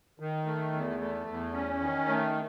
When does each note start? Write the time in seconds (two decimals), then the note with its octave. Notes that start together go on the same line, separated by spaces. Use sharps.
0.20 D#3
0.46 A3
0.73 E2
1.00 A3
1.26 E2
1.53 C#4
1.81 D#3
2.08 A3